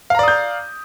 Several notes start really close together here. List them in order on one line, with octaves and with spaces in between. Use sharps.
F5 A#5 D5 D#6 G6